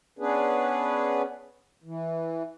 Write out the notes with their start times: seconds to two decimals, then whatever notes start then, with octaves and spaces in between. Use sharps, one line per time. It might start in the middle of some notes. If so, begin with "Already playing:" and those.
0.19 B3 C#4 D4 G#4 B4
1.84 E3